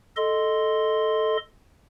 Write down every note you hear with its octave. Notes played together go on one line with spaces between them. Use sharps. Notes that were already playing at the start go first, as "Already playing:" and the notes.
A4 D#5 C6